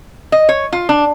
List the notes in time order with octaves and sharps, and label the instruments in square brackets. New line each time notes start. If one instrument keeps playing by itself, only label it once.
[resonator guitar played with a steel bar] D#5
C#5
F4
D4